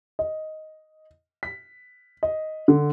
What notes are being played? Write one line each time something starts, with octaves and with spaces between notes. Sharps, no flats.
D#5
B6
D#5
D3